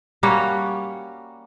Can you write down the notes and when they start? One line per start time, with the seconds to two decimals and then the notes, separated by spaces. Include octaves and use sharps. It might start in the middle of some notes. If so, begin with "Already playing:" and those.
0.23 G3 A#3 C#4 F#4